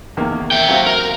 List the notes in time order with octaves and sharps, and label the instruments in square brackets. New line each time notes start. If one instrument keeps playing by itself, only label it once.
[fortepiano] E2 D#3 A#3
[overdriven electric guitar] E5 G5
[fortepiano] F#3 C4 F5
[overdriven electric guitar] A#4